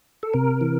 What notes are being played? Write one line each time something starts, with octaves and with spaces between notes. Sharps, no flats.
A4
C3 A#4
E3